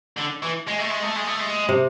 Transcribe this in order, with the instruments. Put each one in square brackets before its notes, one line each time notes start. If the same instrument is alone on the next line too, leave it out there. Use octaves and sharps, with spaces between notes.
[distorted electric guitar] D3
E3
G#3
A3
G#3
A3
G#3
A3
G#3
[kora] C3